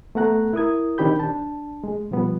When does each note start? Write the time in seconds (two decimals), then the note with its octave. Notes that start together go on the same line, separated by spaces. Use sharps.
0.15 A3 B3 A4 F#5 A#5 F#6
0.53 E4 A#4 D#6 G#6
0.98 D#3 C4 D4 G4 B5 G6
1.20 D4 A5
1.84 G#3
2.11 B2 F3 G3 B3